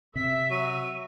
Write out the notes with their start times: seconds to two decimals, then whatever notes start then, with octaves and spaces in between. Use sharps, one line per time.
0.16 C3 E5 B6
0.51 F#3 D#7